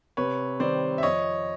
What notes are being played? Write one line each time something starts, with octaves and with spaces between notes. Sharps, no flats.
C3 B4 C#5
D#3 G3 C4 C5 D5
E5
F2 C#5 D#5